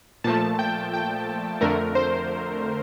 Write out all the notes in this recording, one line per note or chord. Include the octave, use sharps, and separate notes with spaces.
A#2 F3 A3 A5
G5
G5
F2 D3 A3 A#4
C5